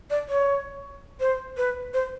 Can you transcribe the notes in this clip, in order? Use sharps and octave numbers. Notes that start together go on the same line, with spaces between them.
D5
C#5
C5
B4
C5